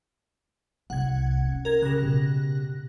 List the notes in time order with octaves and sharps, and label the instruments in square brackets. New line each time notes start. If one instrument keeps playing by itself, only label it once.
[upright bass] C2 [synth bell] F#5 G#6
[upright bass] C#4
[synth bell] A#4 G#6
[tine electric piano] C#3 G4 [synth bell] F#6 A#6
[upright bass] B2